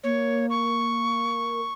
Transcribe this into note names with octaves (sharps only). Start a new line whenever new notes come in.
A#3 C#5
C#6